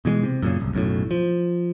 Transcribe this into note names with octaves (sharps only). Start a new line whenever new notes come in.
B2 E3 F#3 G#3
C3
F#2 A#2 C#3
D1 C2
B1 F#2 A2
F3